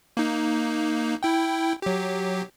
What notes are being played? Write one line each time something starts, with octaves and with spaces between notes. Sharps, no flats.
A#3 D#4
E4 G5
F#3 G4